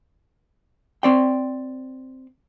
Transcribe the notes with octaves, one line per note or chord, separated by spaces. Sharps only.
C4 D5 G5